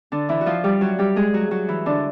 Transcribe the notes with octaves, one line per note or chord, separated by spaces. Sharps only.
D3 D4
E3 E4
F#4
F3 F4
G3 G4
F#3 F#4
G3 G4
G#3 G#4
F#3 F#4
F#3 F#4
E3 E4
D3 D4